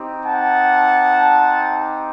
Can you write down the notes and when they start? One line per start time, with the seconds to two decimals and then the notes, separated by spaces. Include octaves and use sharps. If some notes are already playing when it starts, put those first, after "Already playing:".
Already playing: C4 D#4 G4
0.25 F#5 A5